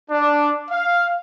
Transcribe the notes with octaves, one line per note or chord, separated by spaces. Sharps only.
D4
F5